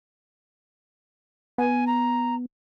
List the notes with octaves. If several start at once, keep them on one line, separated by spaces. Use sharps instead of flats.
B3 G#5
A#5